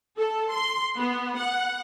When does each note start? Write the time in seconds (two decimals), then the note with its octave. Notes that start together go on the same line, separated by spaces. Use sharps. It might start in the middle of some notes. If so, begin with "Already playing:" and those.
0.18 A4
0.52 C6
0.98 B3
1.39 F#5